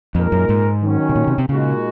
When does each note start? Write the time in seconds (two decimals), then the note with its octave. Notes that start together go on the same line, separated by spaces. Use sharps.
0.15 F2 A#2 G#3 D#4 A#4
0.32 F#2
0.49 G#2
0.82 D#3 F#3 C#4
1.09 C3
1.16 A#2
1.27 C3
1.38 C3
1.49 A#2 C#3 G#3 D#4 F#4 A#4